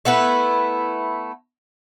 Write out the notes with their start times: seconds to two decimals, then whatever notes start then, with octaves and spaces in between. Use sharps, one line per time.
0.05 A3 B3 E4 B4